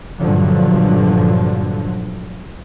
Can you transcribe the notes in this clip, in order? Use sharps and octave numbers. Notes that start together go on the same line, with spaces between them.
G2 A#2 D3 F3 F#3